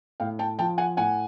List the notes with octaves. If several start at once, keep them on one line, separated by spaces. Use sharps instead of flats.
A2 F5 G5
G5 A5
F3 G5 A5
F#5 G#5
A2 F#5 G#5